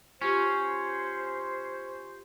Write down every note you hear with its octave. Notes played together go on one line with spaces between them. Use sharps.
C#4 F4 G4 C5